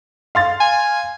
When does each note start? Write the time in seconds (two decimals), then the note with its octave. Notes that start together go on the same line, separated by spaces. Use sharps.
0.35 F5 C6 A6
0.60 G#5